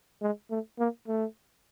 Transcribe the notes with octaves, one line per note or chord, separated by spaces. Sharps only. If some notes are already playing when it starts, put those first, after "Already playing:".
G#3
A3
A#3
A3